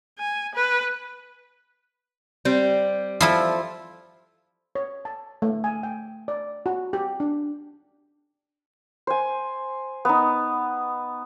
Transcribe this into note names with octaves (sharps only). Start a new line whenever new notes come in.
G#5
B4
G3 C4
F3 E4 A4
C#5
A5
A3
G#5
G5
D5
F#4
G4
D4
C5 G#5
B3 D#4